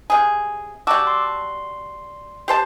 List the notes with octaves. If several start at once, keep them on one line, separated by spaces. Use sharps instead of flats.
C3 G#4
G3 F#4 A5 D6 E6
C6
G4 C5 A5